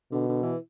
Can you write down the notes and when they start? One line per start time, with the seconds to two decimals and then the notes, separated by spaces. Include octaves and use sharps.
0.12 B2 D3
0.28 D3
0.43 E3